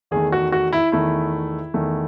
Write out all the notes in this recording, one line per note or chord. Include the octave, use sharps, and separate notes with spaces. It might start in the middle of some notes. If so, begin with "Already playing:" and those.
E2 D#3 A3 G#4
F#4
F#4
E4
E2 D#3 A3 E4
E2 D#3 A3